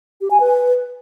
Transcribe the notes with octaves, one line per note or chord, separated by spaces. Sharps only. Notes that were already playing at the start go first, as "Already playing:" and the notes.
G4
G#5
B4